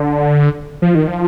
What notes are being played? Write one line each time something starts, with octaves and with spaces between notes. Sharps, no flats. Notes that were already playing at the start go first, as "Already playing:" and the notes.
Already playing: D3
F3
D#3
F3